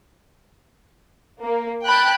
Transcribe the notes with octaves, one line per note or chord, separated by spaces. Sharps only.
A#3
G5 A5 B5 F#6